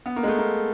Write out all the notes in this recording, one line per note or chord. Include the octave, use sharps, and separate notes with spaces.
B3
A#3
G#3
A3
A#3